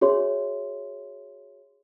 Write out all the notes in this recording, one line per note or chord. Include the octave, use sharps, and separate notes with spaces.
F#4 G#4 C#5 E5 C6